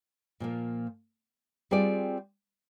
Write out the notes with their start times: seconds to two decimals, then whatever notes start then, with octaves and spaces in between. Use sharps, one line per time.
0.40 A#2 F3 A#3
1.71 G3 C4 F4 G#4 D5